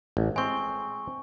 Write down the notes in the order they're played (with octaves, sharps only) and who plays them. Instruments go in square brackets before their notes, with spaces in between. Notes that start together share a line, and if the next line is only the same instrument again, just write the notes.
[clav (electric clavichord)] A1
[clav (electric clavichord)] G#3 C4 [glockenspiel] G#5 C#6